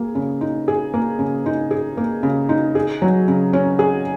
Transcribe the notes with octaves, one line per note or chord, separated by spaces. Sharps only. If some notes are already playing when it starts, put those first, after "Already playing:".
Already playing: A#3 G#4
C#3
D#4
G#4
A#3
C#3
D#4
G#4
A#3
C#3
D#4
G#4
F#3
C#3
C#4
G#4